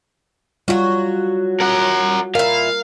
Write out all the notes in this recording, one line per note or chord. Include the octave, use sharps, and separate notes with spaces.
F#3 G3 F4 F#4
A#4 F#5
A#2 E4 A#4 F5